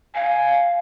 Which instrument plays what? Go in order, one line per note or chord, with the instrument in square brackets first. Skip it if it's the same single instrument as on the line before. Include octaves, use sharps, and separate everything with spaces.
[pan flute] F5 [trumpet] G#5